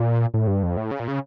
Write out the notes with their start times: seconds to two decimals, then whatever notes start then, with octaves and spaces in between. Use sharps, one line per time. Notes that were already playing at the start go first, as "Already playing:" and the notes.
Already playing: A#2
0.34 A2
0.47 G2
0.63 F2
0.77 A2
0.91 C#3
1.00 A#2
1.08 C#3